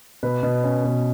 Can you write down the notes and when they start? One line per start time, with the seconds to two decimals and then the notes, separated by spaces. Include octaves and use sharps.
0.23 B2 B4
0.43 B2
0.64 C#4
0.84 B2